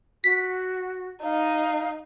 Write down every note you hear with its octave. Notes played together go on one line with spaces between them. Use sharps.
F#4 B6
D#4 F5